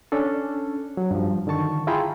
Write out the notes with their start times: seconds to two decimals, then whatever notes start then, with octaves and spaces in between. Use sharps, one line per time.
0.12 C#4 D4 A4
0.97 F#3
1.11 G2 F3
1.47 D3 D#3 A5 C#6
1.87 E4 F4 G#4 G5 A#5 B5